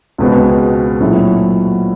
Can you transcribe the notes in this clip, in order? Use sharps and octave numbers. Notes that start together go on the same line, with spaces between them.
C#2 B2 G#3 C4
A#2 F#3 A3 C4 E4